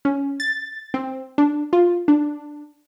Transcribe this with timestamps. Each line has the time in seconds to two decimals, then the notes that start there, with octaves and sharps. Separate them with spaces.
0.05 C#4
0.40 A6
0.94 C4
1.38 D4
1.73 F4
2.08 D4